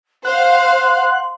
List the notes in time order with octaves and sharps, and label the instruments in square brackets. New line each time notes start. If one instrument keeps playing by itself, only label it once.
[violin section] C5 F5 [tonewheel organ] F#5 F#6 [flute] C6